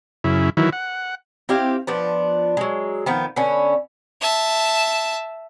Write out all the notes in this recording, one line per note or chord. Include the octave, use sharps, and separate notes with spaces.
F#2 C#3 E4
D#3 E3 F#3 E4
F#5
C4 E4 G4 F5
F3 B3 D4
F#3 G#3
D#3 F3 B3
D3 B3 C#4
E5 A5